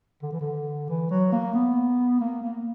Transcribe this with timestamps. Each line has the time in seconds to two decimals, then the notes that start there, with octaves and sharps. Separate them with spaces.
0.22 D3
0.32 E3
0.41 D3
0.89 E3
1.11 F#3
1.32 A#3
1.54 B3
2.21 A#3
2.43 A#3